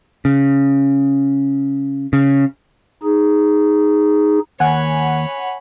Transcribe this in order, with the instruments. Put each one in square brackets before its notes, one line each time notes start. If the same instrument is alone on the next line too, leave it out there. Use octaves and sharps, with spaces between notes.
[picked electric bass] C#3
C#3
[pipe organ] D#4 G#4
[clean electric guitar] D#2 [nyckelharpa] C#5 B5 [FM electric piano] F#5 G#5